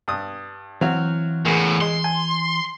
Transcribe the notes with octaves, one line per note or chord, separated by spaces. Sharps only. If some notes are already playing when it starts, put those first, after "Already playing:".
G2 D#6
E3 F#3 C4 F#4 F5
E2 A2 A#3 G#4
G#3 C6
G#5